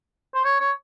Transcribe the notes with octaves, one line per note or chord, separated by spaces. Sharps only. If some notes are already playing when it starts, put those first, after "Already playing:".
C5
C#5
C#5